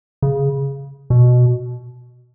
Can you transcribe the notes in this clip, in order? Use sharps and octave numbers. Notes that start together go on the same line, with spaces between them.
C#3
B2